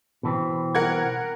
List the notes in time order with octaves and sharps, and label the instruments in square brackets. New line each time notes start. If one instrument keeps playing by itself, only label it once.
[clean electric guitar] B2 E3 C4
[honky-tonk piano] A#4 F#5 G#6